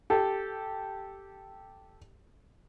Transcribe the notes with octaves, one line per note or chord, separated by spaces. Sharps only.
G4 A4